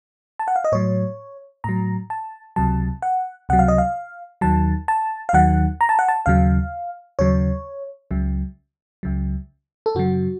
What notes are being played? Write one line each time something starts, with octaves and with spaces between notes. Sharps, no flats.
A5
F#5
F5
D#5
A2 F#3 C#5
A2 F#3 A#5
A5
C#2 C3 F#3 A5
F#5
C#2 C3 F#3 F#5
F5
D#5
F5
D#2 D#3 F#3 A5
A5
F5
D#2 D#3 F#3 F#5
A#5
A5
F#5
A5
D#2 C#3 F#3 F5
D#2 C#3 F#3 C#5
C#2 C#3 F#3
C#2 C#3 F#3
A4
F#2 C#3 F#3 F#4